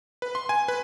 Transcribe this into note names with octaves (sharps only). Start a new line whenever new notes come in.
B4
C6
G#5
B4